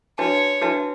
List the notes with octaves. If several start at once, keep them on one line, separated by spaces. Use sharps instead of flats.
D4 F#4 B4 C#5 E5 A5
D4 F#4 B4 E5 A5